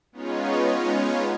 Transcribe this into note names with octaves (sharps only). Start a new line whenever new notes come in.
G#3 B3 C#4 D#4 F4 C#5